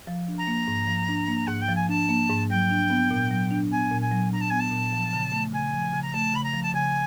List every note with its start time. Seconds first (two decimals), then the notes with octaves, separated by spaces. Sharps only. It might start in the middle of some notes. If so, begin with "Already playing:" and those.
0.07 F3
0.28 D4
0.38 A#5
0.47 A#3
0.68 G#2
0.88 F3
1.09 D4
1.28 A#3
1.47 G#2 F#5
1.61 G5
1.68 F3
1.75 G#5
1.89 D4 A5
2.09 A#3
2.30 G#2
2.50 F#3 G5
2.71 D4
2.90 B3
3.11 A#2
3.31 F#3
3.51 D4
3.71 B3 G#5
3.91 A#2
4.01 G#5
4.11 F#3
4.32 D4 A#5
4.41 A5
4.50 B3 G#5
4.60 A5
4.72 A#2
4.93 F3
5.13 C#3
5.32 A3
5.52 C#3 G#5
5.73 F3
5.93 C#3
6.02 A#5
6.13 A3 A5
6.34 C#3 B5
6.43 A#5
6.53 F3
6.63 A5
6.74 C#3 G#5